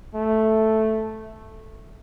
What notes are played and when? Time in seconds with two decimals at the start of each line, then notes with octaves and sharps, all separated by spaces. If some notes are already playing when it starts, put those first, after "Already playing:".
0.14 A3